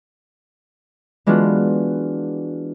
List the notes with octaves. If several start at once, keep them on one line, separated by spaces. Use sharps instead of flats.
E3 G#3 B3 D4 F4 F#4